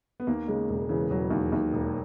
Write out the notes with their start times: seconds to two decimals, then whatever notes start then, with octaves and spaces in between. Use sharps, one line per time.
0.20 B3
0.27 D#2 A#3
0.48 C#3 G#3
0.70 E1
0.89 C#3 E3
1.10 E1 F#3
1.31 D#2
1.52 D#2
1.73 E1